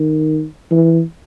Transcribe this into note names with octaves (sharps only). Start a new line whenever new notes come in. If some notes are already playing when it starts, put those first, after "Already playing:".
Already playing: D#3
E3